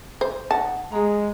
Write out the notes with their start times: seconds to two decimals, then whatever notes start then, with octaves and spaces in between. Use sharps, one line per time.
0.21 C5
0.51 D#4 F#5 A5
0.92 G#3 G#4 A#5